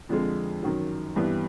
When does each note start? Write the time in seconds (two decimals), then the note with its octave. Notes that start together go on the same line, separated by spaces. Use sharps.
0.09 F2 D3 F3 G#3
0.63 F#2 D#3 F#3
1.16 G2 E3 G3 B3